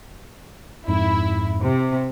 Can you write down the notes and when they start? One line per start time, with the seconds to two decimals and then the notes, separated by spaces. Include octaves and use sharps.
0.88 F2 G#2 E4
1.61 C3